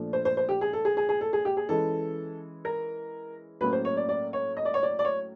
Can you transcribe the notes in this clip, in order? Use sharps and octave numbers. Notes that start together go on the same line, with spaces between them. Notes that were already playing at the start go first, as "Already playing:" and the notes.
Already playing: A#2 F3 A3 D4
C5
C5
C5
G4
G#4
A4
G#4
G#4
G#4
A4
G#4
G4
G#4
E3 G#3 C#4 A4
A#4
A2 F#3 A#3 C#4 B4
C5
C#5
D5
D5
C#5
D#5
D5
C#5
D5
D5
C#5